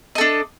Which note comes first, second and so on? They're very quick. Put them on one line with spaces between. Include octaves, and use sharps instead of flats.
D#5 A4 D4